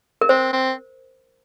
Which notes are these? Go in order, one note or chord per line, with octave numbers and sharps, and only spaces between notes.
A#4
C4 C5
C4